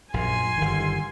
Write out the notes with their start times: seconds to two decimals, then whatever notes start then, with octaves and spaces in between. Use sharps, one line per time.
0.14 A#1 F#2 G#5 C6
0.58 G1 D#3